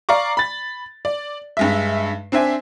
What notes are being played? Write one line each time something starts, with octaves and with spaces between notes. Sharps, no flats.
D5 F5 A#5 C#6 D6
B5 A6
D5
G2 G#3 E5
C4 D4 C5 E5 G#5